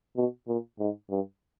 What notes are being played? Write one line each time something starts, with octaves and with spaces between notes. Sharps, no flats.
B2
A#2
G#2
G2